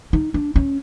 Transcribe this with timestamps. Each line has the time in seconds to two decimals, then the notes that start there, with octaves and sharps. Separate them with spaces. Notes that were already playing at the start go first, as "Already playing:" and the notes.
0.13 D#4
0.34 D4
0.56 C#4